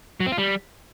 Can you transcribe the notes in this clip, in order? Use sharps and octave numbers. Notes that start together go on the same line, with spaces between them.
F#3
C4
F4
G3